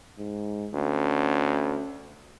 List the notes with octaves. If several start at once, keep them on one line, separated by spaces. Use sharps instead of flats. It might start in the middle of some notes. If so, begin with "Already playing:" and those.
G#2
D2 C#4